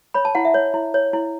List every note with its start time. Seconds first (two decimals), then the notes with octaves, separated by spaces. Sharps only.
0.14 C#5 B5
0.25 A5
0.35 E4 F#5
0.45 E5
0.54 C#5
0.74 E4
0.94 C#5
1.13 E4